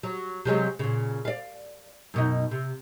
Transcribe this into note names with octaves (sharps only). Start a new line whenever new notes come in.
F#3
C3 F#3 G#3
A#2 C#3
D5 F5
F#2 B2 D#4
C3